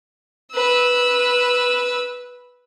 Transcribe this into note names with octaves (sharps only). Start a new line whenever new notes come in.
B4 E6